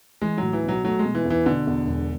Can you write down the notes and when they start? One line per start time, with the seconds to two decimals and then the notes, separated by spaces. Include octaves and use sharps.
0.22 E3 G#3
0.38 A2 F#3
0.53 E3
0.64 B1 F#3
0.84 F#3 A3
0.99 G#3
1.05 B2
1.15 E3
1.25 E2
1.30 E3
1.46 B2 D3
1.67 E2
1.87 E1